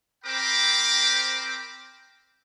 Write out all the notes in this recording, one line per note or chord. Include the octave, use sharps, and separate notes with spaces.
C4 A#4 C5 G5 B5 D6